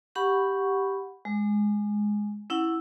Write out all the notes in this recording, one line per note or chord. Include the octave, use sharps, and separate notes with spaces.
G4 F#5 B5 C#6
G#3
C#4 E4 F#5